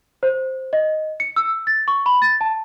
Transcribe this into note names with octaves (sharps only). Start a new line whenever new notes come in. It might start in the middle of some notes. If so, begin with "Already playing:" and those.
C5
D#5
C#7
E6
A6
C#6
B5
A6
A5